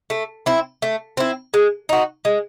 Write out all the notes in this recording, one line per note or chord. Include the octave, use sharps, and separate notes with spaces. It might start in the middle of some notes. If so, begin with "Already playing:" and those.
A3
C4 E4
A3
C4 E4
G#3
D#4 F#4
G#3